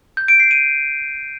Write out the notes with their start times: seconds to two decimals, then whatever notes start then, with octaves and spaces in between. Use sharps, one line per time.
0.17 G6
0.28 D7
0.40 C7
0.51 D#7